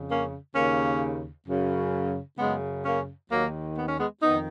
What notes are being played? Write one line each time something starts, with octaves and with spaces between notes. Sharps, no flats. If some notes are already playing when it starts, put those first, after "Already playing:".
Already playing: F2 C#3
A#3 C#4
D#2 C#3 A#3 C#4
F#2 C#3
F#2 C#3 G#3 B3
A#3 C#4
D#2 D#3 F#3 A#3
B3
C#4
G#3 B3
F2 D#3 B3 D#4